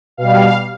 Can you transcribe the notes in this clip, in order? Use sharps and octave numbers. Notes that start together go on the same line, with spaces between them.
B2 G3 F5